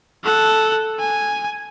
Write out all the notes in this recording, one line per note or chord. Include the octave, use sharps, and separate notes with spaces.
A4 F#5
G#5